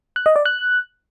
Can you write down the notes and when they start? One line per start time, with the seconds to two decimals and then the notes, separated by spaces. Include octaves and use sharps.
0.16 F#6
0.26 D#5
0.36 D5
0.46 F#6